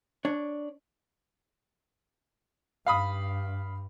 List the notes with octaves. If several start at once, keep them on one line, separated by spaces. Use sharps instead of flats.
D4 C#5
G2 F5 B5 D#6